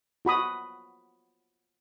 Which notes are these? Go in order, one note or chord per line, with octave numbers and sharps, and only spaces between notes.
F4 F#4 B5 D#6